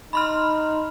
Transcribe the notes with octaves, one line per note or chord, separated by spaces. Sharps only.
D#4 B5 C6 F6